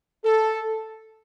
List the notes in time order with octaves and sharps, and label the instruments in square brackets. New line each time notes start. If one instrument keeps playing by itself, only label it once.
[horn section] A4